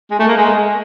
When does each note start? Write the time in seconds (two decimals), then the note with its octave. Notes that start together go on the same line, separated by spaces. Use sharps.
0.11 G#3
0.19 A3
0.28 A#3
0.37 G#3